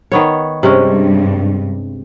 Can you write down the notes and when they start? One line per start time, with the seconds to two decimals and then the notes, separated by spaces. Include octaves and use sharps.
0.12 D#3 B3 C#5
0.63 G2 C3 G#3 C#4